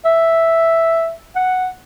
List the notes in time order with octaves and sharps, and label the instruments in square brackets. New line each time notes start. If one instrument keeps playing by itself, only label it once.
[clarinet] E5
F#5